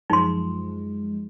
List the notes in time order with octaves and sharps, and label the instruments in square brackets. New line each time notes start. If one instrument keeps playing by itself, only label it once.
[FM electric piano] F#2 F3 G#3 [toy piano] D#4 C6